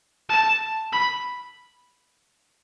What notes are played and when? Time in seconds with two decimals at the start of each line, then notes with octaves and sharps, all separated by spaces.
0.29 A5
0.92 B5